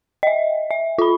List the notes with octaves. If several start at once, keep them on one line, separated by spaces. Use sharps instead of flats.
D#5 E5
E5
F4 B5